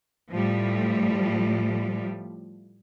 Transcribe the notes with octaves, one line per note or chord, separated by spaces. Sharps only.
A2 F3 G3 A3